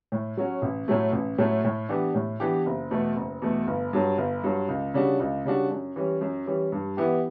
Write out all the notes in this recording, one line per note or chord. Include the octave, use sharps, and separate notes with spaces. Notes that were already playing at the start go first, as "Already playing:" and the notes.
A2
F#3 C#4 F#4
A1
A2 F#3 A3
A1
A2 F#3 A3
A2
E3 B3 D4 G4
A2
E3 B3 D4 G4
F#1
E2 B2 A3
F#1
E2 B2 A3
G1
G2 F#3
G1
G2 F#3
C#2
C#3 G3 D4 F#4
C#2
C#3 G3 D4 F#4
F#2
E3 G3 C#4
F#2
E3 G3 C#4
G2
E3 B3 E4 G4